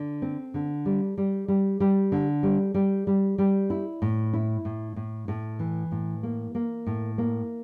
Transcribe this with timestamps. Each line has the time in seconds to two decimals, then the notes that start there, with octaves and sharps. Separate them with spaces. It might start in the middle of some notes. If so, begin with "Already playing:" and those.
Already playing: D3
0.22 C4
0.54 D3
0.85 G3
1.17 G3
1.48 G3
1.80 G3
2.12 D3
2.43 G3
2.74 G3
3.07 G3
3.38 G3
3.70 E4
4.02 A2
4.33 E4
4.65 A2
4.96 A2
5.28 A2
5.59 E3
5.92 A2
6.23 A#3
6.55 A#3
6.86 A2
7.18 A#3